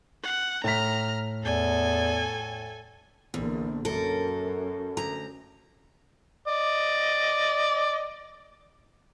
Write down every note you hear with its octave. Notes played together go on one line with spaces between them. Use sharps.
F#5
A2 A#5 F6 B6
E2 A4 G#5
A#1 E2 D3
F#2 A4 A#4
D2 A#5
D5 D#5